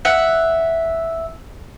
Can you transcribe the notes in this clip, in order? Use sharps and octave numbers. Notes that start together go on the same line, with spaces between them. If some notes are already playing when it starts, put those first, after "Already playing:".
E5 F#5